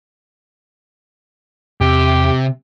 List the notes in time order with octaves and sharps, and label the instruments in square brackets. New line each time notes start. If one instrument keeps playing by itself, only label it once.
[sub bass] E2 [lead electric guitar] C3 [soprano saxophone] G4